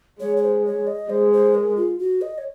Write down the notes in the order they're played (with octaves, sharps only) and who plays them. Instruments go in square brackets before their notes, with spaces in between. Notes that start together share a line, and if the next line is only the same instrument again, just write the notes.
[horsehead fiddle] G#3 [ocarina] C#5
[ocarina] C#5
C5
C#5
D#5
[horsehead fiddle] G#3 [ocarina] C5
[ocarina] C5
A#4
F4
F#4
D#5
C#5